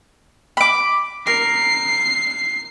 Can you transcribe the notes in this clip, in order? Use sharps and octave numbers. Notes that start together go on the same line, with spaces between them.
B5 D6
A#4 C7